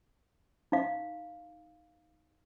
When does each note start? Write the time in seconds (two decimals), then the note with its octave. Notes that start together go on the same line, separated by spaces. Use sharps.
0.72 D#4 F5